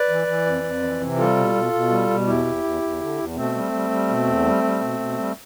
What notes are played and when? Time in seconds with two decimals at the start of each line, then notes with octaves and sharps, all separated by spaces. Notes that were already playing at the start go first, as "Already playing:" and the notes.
Already playing: B4 D5
0.09 E3
0.27 E3
0.46 F2
0.63 F2
0.83 E3
1.01 C3
1.18 G3 F4 A4
1.36 B2
1.55 B2
1.73 B2
1.90 G3
2.10 B2
2.27 E2 E4 G4
2.45 E2
2.64 E2
2.82 E2
3.00 D3
3.18 E2
3.36 B2 A3 C4
3.55 G3
3.72 G3
3.90 G3
4.08 B2
4.26 E2
4.45 G3
4.63 G3
4.81 B2
4.99 B2
5.18 G3